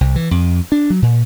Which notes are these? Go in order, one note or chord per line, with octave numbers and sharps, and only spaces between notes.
C2
E3
F2
D4
F#3
A#2